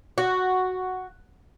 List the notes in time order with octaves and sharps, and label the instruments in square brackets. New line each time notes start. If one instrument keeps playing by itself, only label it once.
[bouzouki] F#4